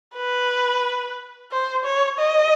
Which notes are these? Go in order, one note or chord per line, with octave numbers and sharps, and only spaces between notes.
B4
C5
C#5
D#5